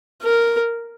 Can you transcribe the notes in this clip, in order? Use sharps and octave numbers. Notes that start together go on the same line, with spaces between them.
A#4